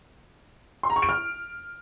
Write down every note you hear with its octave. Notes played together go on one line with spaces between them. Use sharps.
C6
A#5
C#6
D7
F6